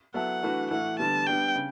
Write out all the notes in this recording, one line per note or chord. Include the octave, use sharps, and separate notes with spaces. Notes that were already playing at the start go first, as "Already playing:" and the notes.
F#3 B3 E4 A4 F#5
E3 A3 D4 F#4 B4
A2 E3 A3 F#5
D3 G3 B3 A5
G3 B3 D4 G5
C#3